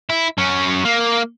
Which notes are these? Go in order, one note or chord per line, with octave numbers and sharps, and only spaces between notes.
E4
F#3 C#4
A#3